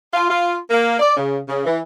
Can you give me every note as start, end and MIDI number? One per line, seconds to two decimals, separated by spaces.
0.13 0.26 65
0.30 0.56 65
0.70 0.95 58
1.00 1.17 74
1.17 1.39 49
1.47 1.63 49
1.66 1.79 52